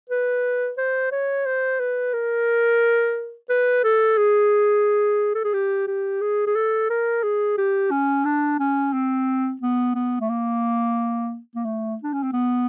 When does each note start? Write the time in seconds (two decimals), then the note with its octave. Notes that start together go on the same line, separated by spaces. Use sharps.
0.09 B4
0.77 C5
1.12 C#5
1.46 C5
1.80 B4
2.13 A#4
3.50 B4
3.84 A4
4.18 G#4
5.34 A4
5.44 G#4
5.54 G4
5.87 G4
6.21 G#4
6.47 G#4
6.56 A4
6.90 A#4
7.23 G#4
7.58 G4
7.91 C#4
8.25 D4
8.60 C#4
8.93 C4
9.61 B3
9.95 B3
10.20 A3
10.29 A#3
11.55 A#3
11.65 A3
12.03 D4
12.13 C#4
12.23 C4
12.33 B3